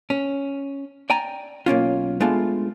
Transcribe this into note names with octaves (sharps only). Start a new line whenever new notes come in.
C#4
D5 G5 G#5 A#5
B1 A#3 C#4 F4
G#3 A3 B3 D4 F4